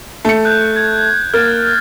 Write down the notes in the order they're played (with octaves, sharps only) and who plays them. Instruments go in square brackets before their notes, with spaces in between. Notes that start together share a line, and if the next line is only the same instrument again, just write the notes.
[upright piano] A3 C#7
[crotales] F#6 G6
G#6
[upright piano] A#3 [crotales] F6 A6